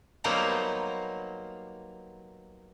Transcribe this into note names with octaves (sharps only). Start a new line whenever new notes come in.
F#3 G3 A#3 B3 D#4 C5